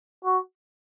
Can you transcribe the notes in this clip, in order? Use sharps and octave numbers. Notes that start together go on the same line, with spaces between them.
F#4